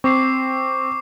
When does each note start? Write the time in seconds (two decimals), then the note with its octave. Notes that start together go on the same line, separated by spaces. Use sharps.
0.04 C4 C#6 D6 C7